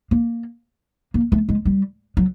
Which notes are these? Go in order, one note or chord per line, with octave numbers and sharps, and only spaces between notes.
A#3
A#3
A3
G#3
G3
F#3